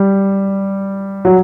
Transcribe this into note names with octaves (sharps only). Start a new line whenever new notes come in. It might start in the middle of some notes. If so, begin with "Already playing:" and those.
Already playing: G3
F#3